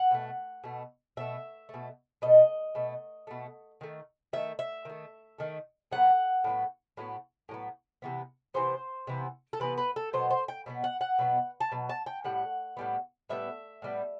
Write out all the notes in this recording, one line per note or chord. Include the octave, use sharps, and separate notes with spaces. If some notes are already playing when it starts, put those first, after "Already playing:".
Already playing: F#5
B2 A3
B2 A3
B2 A3 E5
B2 A3
B2 A3 D#5
B2 A3
B2 A3
D#3 A3
D#3 A3 E5
E5
D#3 A3
D#3 A3
A2 F#3 B3 F#5
A2 F#3 B3
A2 F#3 B3
A2 F#3 B3
C3 E3 B3
C3 E3 B3 C5
C3 E3 B3
A4
C3 E3 B3 B4
B4
A4
B2 F#3 B3 C5
C5
G5
B2 F#3 B3
F#5
F#5
B2 F#3 B3
A5
B2 F#3
A5
G5
A2 G3 F#5
A2 G3 B3
A2 G3 B3 E5
A2 G3 B3